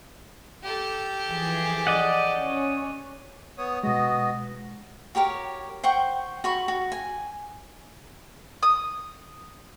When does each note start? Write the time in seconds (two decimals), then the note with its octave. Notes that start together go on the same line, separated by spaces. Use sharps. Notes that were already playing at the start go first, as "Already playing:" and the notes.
0.63 G4 A4
1.27 E3 F3 G#4
1.87 D5 D#5 F#5
2.38 C#4
3.58 B3 C#5 D#6
3.83 B2 G#3 B3 F#4 D#5
5.15 F#4 G4 A#4 C#5
5.83 C5 F#5 G5 C#6
6.44 F#4 B5 C#6
6.68 F#4
6.92 G#5
8.63 D#6